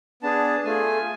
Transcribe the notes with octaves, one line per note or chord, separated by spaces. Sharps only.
B3 D4 G#4 A5
A3 F4 G#4 G#5